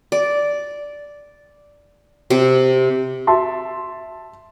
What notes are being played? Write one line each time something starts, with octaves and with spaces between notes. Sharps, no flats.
D5
C3
E5 A5 C6